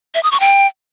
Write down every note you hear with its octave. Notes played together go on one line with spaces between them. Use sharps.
E5
D#6
C#6
G5